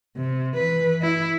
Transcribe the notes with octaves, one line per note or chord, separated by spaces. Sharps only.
C3
E3 B4
E4